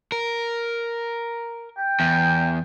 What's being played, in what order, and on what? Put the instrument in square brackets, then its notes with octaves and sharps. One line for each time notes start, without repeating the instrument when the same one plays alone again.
[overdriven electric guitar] A#4
[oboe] G5
[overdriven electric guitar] E2